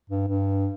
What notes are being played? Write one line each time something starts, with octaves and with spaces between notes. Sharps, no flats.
G2
G2